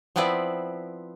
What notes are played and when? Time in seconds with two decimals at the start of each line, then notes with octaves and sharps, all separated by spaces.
0.16 F3 B3 C4 E4 B4 D5